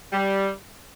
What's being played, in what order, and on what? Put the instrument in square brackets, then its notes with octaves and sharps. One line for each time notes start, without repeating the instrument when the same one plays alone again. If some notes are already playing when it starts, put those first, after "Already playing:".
[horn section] G3